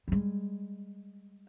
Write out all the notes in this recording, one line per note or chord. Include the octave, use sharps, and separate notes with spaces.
G3 G#3